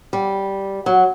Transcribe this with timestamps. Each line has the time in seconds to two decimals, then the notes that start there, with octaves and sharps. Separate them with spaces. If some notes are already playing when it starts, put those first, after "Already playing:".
0.13 G3
0.86 F#3